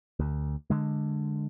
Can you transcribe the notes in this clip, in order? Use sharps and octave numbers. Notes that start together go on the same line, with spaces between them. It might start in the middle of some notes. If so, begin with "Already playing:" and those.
D2
D3 G#3